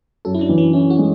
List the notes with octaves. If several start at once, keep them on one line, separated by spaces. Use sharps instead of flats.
F#2 A4
E4
D4
E3
C#4
C#4 E4
F#4
G#3